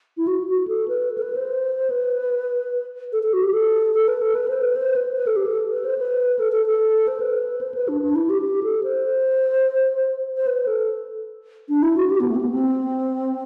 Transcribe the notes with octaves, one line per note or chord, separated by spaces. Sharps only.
E4
F#4
F#4
A4
B4
A4
B4
C5
B4
A4
A4
F#4
G4
A4
A4
B4
A4
B4
C5
B4
C5
B4
B4
A4
G4
A4
B4
C5
B4
A4
A4
A4
C5
B4
C5
B4
D4
D4
E4
G4
G4
A4
C5
C5
B4
A4
D4
E4
F#4
G4
B3
A3
C4
B3
C4